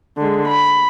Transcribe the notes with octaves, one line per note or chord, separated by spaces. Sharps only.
D3 G#3
B5